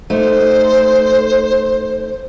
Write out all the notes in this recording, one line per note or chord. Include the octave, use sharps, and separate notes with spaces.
A3 D#4 C5